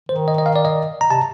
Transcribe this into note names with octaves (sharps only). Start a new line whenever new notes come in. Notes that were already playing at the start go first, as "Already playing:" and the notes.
D#3 C5
D#5
D#5
F5
D5
D#5
A#5
C3 A5